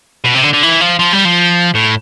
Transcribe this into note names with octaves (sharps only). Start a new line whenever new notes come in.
B2
C3
D3
D3
E3
F3
F3
G3
F3
A2